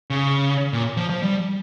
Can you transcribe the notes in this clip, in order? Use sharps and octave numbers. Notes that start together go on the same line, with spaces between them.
C#3
A#2
F3
F3
G3